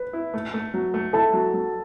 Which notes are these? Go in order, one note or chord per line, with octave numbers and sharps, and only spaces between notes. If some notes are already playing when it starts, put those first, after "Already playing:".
Already playing: B4
E4
A3
A3
F#3
A3
E4 A4 A5
F#3
F#3